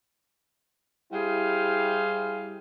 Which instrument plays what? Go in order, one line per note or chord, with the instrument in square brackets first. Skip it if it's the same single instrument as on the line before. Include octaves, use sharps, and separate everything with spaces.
[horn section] G3 E4 G4 G#4 C5 F5